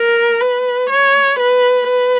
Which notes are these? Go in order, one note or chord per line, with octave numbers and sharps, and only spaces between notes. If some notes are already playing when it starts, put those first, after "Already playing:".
Already playing: A#4
B4
C#5
B4
B4